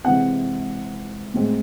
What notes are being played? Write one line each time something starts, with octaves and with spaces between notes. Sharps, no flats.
C3 E3 G#3 C4 F#5
A2 G#3 C4